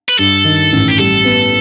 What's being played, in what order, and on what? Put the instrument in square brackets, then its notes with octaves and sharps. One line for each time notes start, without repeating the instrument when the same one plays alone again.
[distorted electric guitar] B4
[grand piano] G2 [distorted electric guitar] A4
[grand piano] D#3
A1
[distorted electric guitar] G4
[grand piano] G3 [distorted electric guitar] A4
[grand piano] B3